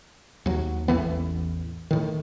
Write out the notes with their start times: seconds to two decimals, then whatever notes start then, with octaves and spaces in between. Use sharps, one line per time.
0.46 D#2 F#3
0.88 A1 E2 E3 B3
1.91 A2 D#3